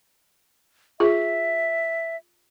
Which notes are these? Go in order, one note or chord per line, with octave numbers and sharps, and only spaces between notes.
F4 G#4 E5